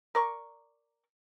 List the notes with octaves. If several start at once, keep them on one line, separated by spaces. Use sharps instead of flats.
A#4 D5 C#6